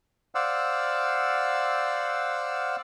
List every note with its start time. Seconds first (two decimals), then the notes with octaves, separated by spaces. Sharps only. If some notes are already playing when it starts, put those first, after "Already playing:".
0.35 C5 D5 F5 F#5 E6